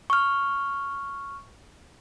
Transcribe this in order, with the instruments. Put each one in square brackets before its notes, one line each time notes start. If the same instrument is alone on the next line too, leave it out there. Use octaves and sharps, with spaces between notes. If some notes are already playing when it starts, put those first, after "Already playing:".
[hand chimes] C#6 F6